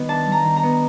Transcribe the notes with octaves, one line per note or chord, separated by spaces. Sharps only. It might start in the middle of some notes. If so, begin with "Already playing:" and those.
Already playing: D#3 G3 B3
D4 A5
G3
A#5
D#3
A#5
B3